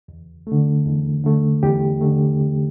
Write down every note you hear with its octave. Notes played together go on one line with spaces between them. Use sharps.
E2
D3 A3
E2
D3 A3
E2 G4
D3 A3
E2